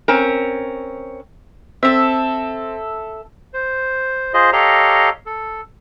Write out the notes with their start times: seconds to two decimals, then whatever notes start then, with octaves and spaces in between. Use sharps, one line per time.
0.08 C4 C#4 A#4
1.83 C4 A4 E5
3.54 C5
4.34 F4 G#4 C5 D#5
4.53 G4 A4 C#5 D#5 F5 A#5
5.26 A4